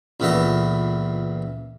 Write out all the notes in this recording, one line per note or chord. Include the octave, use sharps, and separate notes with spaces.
C#2 A#2 E3 B3 A4 D#5